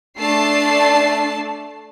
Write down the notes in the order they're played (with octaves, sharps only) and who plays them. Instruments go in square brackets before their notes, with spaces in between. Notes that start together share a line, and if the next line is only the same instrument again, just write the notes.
[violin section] A3 D4 A5 C7